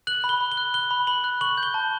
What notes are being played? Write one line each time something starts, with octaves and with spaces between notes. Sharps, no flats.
F#6 F#7
B5
G7
B5
G7
F#6
F#6 G7
B5
B5 F#7
F#6
C#6 F#7
G6
G7
A5